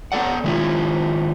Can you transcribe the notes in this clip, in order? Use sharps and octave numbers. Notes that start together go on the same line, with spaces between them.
B3 C4 A4 D5 F#5
D#3 G#3 E4 F4